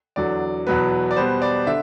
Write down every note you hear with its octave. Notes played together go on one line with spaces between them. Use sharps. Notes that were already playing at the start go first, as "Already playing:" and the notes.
E2 D3 F#3 D5
E2 B2 F#3 B3 B4
D5
B2 G3 B3 C5
D5
D3 E5